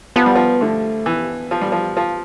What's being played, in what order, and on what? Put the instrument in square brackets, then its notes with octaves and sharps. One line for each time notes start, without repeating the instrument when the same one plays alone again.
[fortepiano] F3 [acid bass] B3
[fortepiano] G3
F3
[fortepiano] D3 [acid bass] A3
[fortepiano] E3 [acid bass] B3
[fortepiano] F3
G3
F3
F3